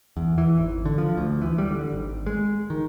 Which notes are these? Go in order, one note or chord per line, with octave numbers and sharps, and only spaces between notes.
E2
E3
G#1
D3
F3
D2
E3
G3
D3
G#1
G#3
D#3